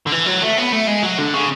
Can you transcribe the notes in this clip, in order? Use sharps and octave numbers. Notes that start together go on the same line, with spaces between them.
D3
E3
F#3
A3
B3
A3
G#3
F#3
D3
C#3